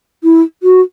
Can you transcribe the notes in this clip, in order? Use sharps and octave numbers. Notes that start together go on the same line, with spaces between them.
E4
F#4